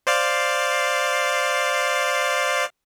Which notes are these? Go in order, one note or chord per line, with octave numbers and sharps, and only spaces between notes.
C5 D5 F5